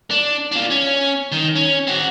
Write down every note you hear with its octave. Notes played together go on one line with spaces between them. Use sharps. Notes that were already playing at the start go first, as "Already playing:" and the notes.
D4
D4 F4
C#4
D#3
C#4
C4 F#4